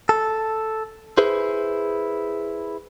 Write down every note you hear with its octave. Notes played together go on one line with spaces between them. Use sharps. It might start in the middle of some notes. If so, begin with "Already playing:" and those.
A4
E4 G#4 B4 C5